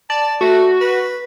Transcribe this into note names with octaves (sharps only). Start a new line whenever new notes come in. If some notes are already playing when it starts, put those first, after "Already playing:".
D5 A5
A3 F#4
B4